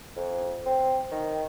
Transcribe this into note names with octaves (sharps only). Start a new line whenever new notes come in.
F2
C4
D#3